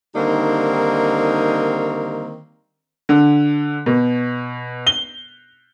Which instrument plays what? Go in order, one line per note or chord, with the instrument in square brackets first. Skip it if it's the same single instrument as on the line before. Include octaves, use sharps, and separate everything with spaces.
[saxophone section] D3 D#3 G3 A#3 C4 D#4
[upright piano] D3
B2
G7